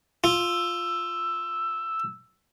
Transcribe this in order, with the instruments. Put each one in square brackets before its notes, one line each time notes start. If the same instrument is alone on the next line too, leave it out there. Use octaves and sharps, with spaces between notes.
[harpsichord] F4 [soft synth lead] E6